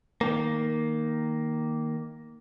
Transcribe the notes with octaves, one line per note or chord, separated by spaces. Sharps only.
D#3 A#3